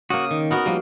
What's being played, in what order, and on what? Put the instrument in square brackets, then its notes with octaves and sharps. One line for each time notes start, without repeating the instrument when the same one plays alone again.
[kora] C#3 A#3 [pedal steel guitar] F#4 [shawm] D#6
[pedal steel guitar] D#3
[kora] B3 D#4 F#4 [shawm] A#4
[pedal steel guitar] F3 G3 [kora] A#3